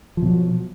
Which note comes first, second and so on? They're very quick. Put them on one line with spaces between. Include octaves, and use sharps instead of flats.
F3 B2 F#3